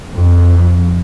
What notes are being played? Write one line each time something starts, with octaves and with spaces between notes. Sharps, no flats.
F2